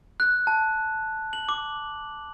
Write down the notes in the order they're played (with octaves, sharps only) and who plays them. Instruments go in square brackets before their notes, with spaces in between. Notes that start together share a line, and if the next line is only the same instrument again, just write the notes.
[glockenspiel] F#6
A5
F#7
D6